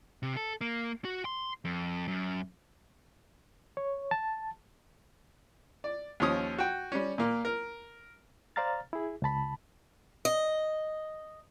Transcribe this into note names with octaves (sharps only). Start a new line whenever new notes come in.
C3
A4
A#3
F#4
C6
F2
F#2
C#5
A5
D5
D#2 F3 C#4 D#6
F#4 G5
G3 C#4
A#2 A#3
A#4
C5 D5 F5 A#5 F6 A6
E4 G#4
C#2 C#3 A5 B5
D#5